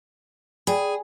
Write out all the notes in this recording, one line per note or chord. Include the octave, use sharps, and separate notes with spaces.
G#4 D5 G5 B5